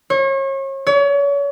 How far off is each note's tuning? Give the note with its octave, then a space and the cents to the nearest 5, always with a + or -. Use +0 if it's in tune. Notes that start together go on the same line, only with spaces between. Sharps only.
C#5 -35
C#5 +35